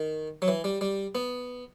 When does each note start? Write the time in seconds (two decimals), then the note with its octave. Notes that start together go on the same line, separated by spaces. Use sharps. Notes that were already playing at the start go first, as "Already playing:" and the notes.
Already playing: D#3
0.42 F#3
0.48 E3
0.64 G3
0.81 G3
1.15 B3